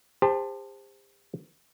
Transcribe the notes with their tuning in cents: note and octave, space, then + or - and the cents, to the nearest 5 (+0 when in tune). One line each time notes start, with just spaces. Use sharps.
G4 +45 C5 +0 A5 +10